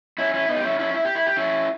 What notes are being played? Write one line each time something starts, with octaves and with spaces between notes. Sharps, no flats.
C#4 E4
C#4 E4
B3 D#4
G4
C#4 E4
C#4 E4
E4
G4
E4
G4
C#4 E4